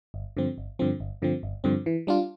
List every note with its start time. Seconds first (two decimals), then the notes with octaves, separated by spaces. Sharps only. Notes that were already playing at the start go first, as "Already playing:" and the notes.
0.14 G1
0.37 G2 D3 F3 C4
0.58 G1
0.79 G2 D3 F3 C4
1.00 G1
1.22 G2 D3 F3 C4
1.43 G1
1.64 G2 D3 F3 C4
1.86 E3
2.07 G3 D4 F4